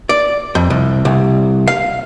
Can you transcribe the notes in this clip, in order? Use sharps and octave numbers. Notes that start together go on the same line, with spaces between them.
D5
F2
C2
C2
F5